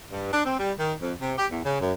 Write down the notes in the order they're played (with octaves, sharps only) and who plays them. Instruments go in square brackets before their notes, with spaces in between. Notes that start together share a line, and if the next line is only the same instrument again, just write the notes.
[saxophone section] G2
D4
C4
G3
D#3
F2
C3
G4
E2
C#3
F#2